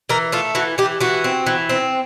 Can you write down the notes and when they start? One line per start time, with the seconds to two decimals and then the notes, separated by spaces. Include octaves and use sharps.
0.09 E3 A#4
0.32 A3 F4
0.55 E3 F#4
0.78 E3 G4
1.00 E3 F#4
1.24 C4
1.46 E3
1.69 C4